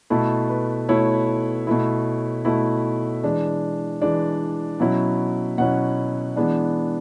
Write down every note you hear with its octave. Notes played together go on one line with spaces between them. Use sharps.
B2 A3 E4 A4
B4
B2 A3 E4 C#5
B2 A3 E4
B2 A3 E4
E3 G#3 D4
E3 G#3 D4 D5
B2 F#3 C#4 E4
B2 F#3 C#4 E4 F#5
E3 G#3 B3 D4